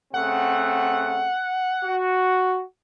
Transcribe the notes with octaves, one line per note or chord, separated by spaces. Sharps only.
C#3 A3 C4 F#5
F#4